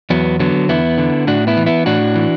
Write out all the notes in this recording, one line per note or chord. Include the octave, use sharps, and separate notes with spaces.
E2 F#3 B3
D3 F#3 B3
E2 B3 E4
D3
A2 D4 F#4
B3 E4
E3
B3 E4
A2 D4 F#4
E3